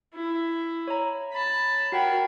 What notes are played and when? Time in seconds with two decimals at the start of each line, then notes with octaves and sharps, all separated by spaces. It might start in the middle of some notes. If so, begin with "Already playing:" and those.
0.15 E4
0.87 C#5 A#5
1.33 A5 B5
1.92 F#4 A#4 F#5 G5 B5